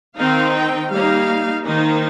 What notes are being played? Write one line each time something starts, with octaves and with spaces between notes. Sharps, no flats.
D#3 C4 D#4 F5
G5
G3 A#3 D#4 F5
D#3 A#3 D#4 C5